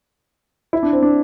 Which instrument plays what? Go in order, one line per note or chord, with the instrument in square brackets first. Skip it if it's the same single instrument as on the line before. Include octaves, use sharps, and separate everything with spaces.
[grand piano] E4
D4
C4
D4